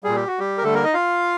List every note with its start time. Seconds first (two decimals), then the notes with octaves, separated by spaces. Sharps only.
0.04 A#2 G3 G#4
0.16 G4
0.28 F#4
0.39 G3 G4
0.58 A#4
0.63 D3 G3 A3 A4
0.74 A#3 A#4
0.84 D#4 D#5
0.94 F4 F5